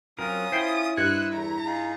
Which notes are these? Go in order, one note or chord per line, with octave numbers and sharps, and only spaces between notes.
F#3 C4 C#4 F4 A#4 D#6
E4 C5 G5 C6
G2 C5 D#5 E6 F#6 G#6 C#7
E2 A3 A#5
D#4 F4 G#4